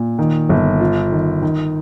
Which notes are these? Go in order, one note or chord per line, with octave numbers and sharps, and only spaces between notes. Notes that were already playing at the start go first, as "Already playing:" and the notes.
Already playing: A#2
D#3
G1
F4
D#3
D#3